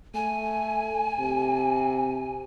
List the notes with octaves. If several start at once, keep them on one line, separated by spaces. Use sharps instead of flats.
A3 G#5
C3